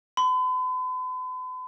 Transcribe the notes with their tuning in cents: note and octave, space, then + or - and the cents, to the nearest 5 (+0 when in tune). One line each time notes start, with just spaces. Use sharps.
B5 +45